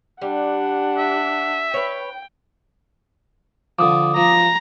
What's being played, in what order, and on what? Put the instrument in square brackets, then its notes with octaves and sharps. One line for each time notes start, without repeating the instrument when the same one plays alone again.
[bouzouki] G3 [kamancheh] D4 F#5
[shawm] E5
[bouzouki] B4 C#5 [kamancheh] G5
[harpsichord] D3 F3 [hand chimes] D6 D#6
[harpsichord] F3 [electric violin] A#5